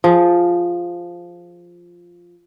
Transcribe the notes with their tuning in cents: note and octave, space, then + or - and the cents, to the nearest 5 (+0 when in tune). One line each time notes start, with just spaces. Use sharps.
F3 +0 G#4 +0